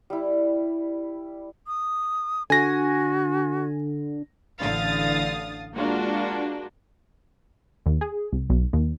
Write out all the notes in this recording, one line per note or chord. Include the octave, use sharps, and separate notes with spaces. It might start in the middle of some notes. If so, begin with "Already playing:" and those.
G3 E4
D#6
D3 F#4 G#5 A#6
A1 D3 F5 D#6 A6
G#3 A#3 D4 F4 F#4
D#2
G#4
C2
B1
D#2